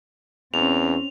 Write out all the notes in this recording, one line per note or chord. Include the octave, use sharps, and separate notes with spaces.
E2 C4 C#4 F7